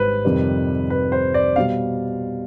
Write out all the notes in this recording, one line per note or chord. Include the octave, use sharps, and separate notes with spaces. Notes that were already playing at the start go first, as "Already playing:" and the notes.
Already playing: G#1 G#2 G3 B4 C5
F2 C3 D#3 G3
B4
C5
D5
B2 G3 F5